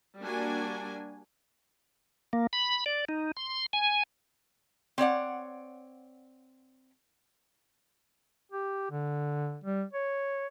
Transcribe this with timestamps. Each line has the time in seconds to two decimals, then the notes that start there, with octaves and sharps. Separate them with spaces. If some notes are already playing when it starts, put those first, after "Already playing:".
0.20 G3 A#3 D4 F#4 G#5
2.33 A#3
2.53 B5
2.86 D5
3.09 D#4
3.37 C6
3.73 G#5
4.98 C4 C#5 D5 F#5
8.51 G4
8.91 D3
9.64 G3
9.93 C#5